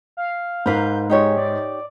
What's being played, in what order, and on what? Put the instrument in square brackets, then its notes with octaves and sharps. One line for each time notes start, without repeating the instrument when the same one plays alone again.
[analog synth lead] F5
[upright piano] G#2 [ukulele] A#4 B4 F5 [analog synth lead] G6
[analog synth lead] G#3 [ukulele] D#4 G4 C#5
[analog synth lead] D5